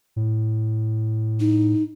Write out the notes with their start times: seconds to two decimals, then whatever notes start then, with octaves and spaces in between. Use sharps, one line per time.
0.16 A2
1.40 D#4